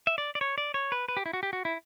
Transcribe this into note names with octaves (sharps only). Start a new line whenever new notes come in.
E5
D5
D5
C#5
D5
C#5
B4
B4
G4
E4
F#4
G4
F#4
E4